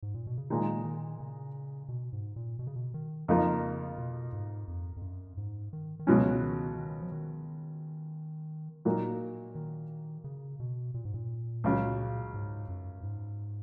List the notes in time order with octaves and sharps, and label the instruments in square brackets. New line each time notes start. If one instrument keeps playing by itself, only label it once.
[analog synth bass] G#2
A#2
B2
C#3
[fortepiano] A#2 G#3 D#4 [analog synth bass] D#3
[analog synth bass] D#3
C#3
B2
G#2
A#2
B2
C#3
B2
D#3
[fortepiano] F2 F3 A#3 D#4 [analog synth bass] C#3
[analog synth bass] B2
G#2
F2
F2
F#2
G#2
D#3
D#3
[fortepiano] C#2 B2 F#3 C#4 [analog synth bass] F3
[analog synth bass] C#3
D#3
D#3
F3
D#3
[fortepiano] A#2 F#3 A#3 D#4
[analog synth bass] D#3
C#3
B2
A#2
G#2
A#2
[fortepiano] C#2 C#3 F#3
[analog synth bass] G#2
F#2
G#2